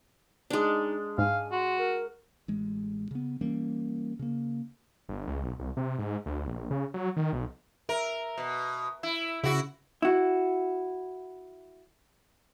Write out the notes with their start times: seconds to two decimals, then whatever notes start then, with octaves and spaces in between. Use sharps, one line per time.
0.50 G#3 D4 D#4
1.18 G#2 F5 G#5
1.52 F#4 C6
1.78 A#4
2.48 A1 G#3
3.11 C#3 B3
3.41 E3 G3 A#3 C#4
4.19 C#3 A#3
5.09 G1
5.27 C#2
5.44 B1
5.59 C2
5.77 C3
5.98 G#2
6.26 D2
6.47 A#1
6.71 C#3
6.94 F#3
7.17 D#3
7.33 B1
7.89 A#4 E5
8.37 B2
9.03 E4
9.44 C#3 E4 F#4
10.02 E4 F#4